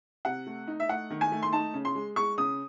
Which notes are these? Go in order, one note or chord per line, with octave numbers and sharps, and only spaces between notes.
C3 F#5
A3
D#4
E5
A3 F#5
D#3
G#5
A3
C6
D#4 A5
C#3
C6
G#3
G#3 C#6
C#3 D#6